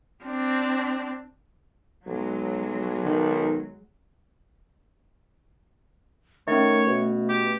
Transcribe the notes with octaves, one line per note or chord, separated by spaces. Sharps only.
C4 D4
B1 F#3 G#3
D#3
D#3 A3 C#4 C#5 E5
B2
G4